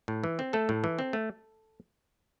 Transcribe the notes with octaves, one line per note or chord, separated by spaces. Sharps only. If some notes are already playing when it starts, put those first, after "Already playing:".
A2
E3
C4
A3 A4
A2
E3
C4
A3